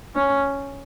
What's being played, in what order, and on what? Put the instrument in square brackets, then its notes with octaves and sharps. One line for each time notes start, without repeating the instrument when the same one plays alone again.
[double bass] C#4